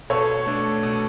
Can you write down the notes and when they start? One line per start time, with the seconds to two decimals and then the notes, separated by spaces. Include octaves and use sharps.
0.10 B2 A4 C#5
0.46 A3 D4
0.83 B2